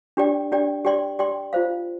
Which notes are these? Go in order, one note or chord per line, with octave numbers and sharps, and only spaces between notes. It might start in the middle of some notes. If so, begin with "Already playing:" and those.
D4 G4 D5 G5
D4 G4 D5 G5
G4 D5 G5 C6
G4 D5 G5 C6
F4 C5 F5